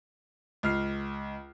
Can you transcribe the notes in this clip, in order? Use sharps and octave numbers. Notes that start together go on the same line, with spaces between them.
C#2 F6 C7